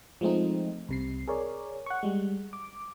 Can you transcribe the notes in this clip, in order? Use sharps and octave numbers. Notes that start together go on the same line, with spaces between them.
F3 G#3 A3 C4 D#4
C2 C3 C7
G#4 A#4 C#5 D5
F#5 C#6
G3 G#3
D6